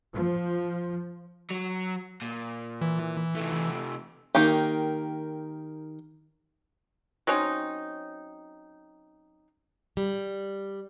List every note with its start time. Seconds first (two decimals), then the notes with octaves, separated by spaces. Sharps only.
0.13 F3
1.50 F#3
2.22 A#2
2.82 E3
3.36 C3 A3
4.35 D#3 A#3 G4
7.27 F#3 C4 C#4 D#4
9.97 G3